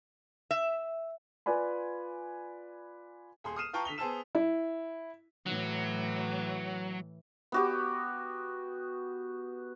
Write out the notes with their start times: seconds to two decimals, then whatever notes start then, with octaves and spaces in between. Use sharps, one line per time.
0.51 E5
1.46 F4 B4 D5 G#5 B5
3.44 D#1 G#4 C6
3.56 D#6 F6 C7 D#7 E7
3.73 F4 B4 G5 A5 A#5 C#6
3.85 D3 B6 F7 G7
3.98 B3 G#4 C5 A5 E6 E7
4.35 E4
5.46 A2 E3 F#3
7.52 B3 F#4 G4